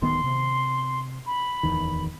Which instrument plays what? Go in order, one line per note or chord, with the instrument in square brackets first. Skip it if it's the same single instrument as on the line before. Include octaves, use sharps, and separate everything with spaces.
[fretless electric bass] D1 D#3 B3 [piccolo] C6
[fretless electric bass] C3
[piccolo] B5
[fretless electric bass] D1 E2 D#3